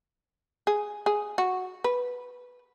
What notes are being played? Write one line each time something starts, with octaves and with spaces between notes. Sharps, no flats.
G#4
G#4
F#4
B4